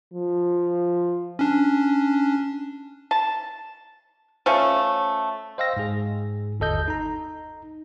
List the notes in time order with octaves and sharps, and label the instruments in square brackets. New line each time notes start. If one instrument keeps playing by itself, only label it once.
[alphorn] F3
[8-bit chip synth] C#4 D4
[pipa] A5
F3 A3 C#4
[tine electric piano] C5 D#5 F5 G5 E6 A#6
G#2 G#4
G1 D#2 A4 D#5 G6
D#4 A#5